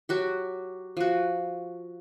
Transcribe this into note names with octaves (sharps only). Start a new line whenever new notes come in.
F#3 F#4 G4
F3 F#4